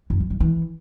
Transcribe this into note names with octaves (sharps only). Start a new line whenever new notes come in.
F#2
F3
G2
E3